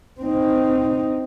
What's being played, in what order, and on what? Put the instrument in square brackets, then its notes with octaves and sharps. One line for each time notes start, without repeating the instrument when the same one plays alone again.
[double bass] C4 D#4